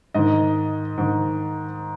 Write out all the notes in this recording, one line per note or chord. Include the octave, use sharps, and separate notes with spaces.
G#2 D#3 D#5
G#2 D#3